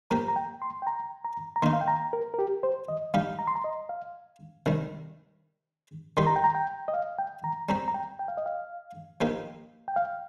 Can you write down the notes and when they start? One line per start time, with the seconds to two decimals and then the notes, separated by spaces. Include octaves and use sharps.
0.10 F3 A#3 G4 A#5
0.28 A#5
0.36 G5
0.62 C6
0.82 G5
0.87 A#5
1.24 A#5
1.56 A#5
1.62 D#3 A#3 D#4 C6
1.73 F5
1.81 G5
1.88 A#5
2.13 A#4
2.34 A#4
2.39 G4
2.63 C5
2.88 D#5
3.14 G3 D#4 G4 F5
3.39 A#5
3.47 C6
3.55 A#5
3.64 D#5
3.89 F5
4.66 C3 D#3 G3
6.17 D#3 G3 D#4 G4 C6
6.27 A#5
6.36 G5
6.44 A#5
6.55 G5
6.88 D#5
6.94 F5
7.18 G5
7.44 A#5
7.69 G3 C4 G4 A#5
7.88 A#5
7.94 G5
8.19 G5
8.28 F5
8.37 D#5
8.46 F5
9.21 F3 A#3 D#4 G4
9.88 G5
9.96 F5